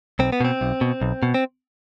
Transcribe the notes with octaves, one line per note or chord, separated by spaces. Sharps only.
B1 C4
B3
B2 C4
B1
B2
B1
B2
C4